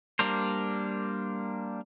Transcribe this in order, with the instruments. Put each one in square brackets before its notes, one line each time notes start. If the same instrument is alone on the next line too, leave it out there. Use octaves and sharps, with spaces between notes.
[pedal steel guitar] G3 A#3 D4 A#4 C5